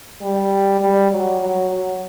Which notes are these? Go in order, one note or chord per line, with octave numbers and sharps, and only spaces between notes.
G3
G3
F#3
F#3
F#3